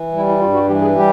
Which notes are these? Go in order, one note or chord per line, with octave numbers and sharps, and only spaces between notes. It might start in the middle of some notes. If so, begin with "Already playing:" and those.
Already playing: E3
G3 E4
E4
G2 F4
F#4
E3 G4
G#4
G3 G4